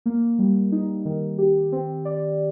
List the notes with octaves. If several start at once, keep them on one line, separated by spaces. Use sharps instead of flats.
A#3
G3
D#4
D#3
G4
C4
D5